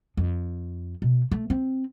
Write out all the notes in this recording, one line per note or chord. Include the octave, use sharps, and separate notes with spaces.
F2
B2
A3
C4